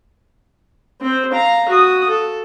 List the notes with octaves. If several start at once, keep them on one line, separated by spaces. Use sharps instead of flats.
C4 C5
F5 A#5
F#4 D#6
A4